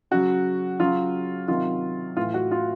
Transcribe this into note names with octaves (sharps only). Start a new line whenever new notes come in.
C#3 F#3 F#4
C#3 F#3 F4
C3 D#3 F#3 F4
A2 E3 F4
F#4
F4